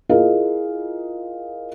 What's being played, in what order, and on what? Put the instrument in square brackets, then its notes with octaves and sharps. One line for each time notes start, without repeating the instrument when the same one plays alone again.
[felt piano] E4 F4 G#4 A#4 D#5 F5